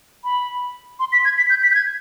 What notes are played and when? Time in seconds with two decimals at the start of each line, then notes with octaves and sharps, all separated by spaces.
0.24 B5
1.00 C6
1.12 B6
1.25 G#6
1.38 B6
1.50 G6
1.63 B6
1.71 G6
1.75 G#6